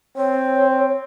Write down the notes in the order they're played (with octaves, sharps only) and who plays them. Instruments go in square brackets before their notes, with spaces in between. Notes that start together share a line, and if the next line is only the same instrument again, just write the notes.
[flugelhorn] C4 [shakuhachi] C#5